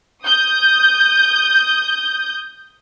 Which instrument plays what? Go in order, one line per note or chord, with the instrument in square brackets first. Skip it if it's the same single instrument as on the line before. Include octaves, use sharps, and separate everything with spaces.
[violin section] D#6 G6